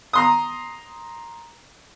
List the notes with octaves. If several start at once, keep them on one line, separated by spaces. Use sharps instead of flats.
A#5 C6 D#6